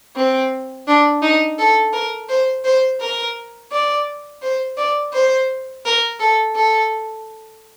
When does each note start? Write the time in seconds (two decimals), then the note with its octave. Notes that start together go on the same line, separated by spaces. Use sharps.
0.16 C4
0.88 D4
1.22 D#4
1.59 A4
1.93 A#4
2.29 C5
2.65 C5
3.01 A#4
3.72 D5
4.42 C5
4.78 D5
5.13 C5
5.86 A#4
6.20 A4
6.56 A4